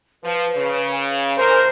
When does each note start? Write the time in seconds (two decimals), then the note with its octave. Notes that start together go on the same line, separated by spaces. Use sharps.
0.24 F3 B4
0.56 C#3
0.92 G#5
1.38 A2 G#3 A#4 C5